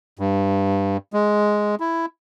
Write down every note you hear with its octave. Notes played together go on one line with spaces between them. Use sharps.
G2
G#3
E4